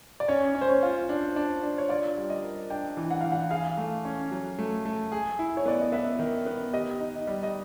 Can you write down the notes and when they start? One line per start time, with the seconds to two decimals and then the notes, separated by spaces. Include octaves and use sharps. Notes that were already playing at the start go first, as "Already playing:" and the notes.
0.20 D5
0.28 C#4 C#5
0.55 C#4
0.61 C5
0.69 C#5
0.83 F4
1.09 D4
1.36 D4
1.63 D4
1.78 C#5
1.89 F4 D5
2.17 G3
2.30 D#5
2.43 A#4
2.70 D4 G5
2.97 E3
3.11 F#5
3.21 E3 F5
3.32 F#5
3.50 G#4 F5
3.78 A3
4.05 C#4
4.32 F#3
4.59 A3
4.85 A3
5.12 G#4
5.39 E4
5.57 C#5
5.66 B3 D5
5.81 D#5
5.92 B3 E5
6.19 D#3
6.46 B3
6.73 G4 D#5
7.00 D#4
7.27 G3
7.43 D#5